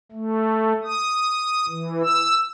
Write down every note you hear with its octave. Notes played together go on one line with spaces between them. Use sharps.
A3
D#6
E3
E6